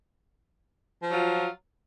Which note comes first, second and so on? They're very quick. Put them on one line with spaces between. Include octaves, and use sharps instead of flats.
F3 F#3 F4